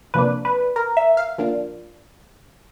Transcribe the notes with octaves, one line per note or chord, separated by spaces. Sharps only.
C3 F3 A#3 D4 B4
B4
A#4
E5
F5
F3 A#3 D4 F4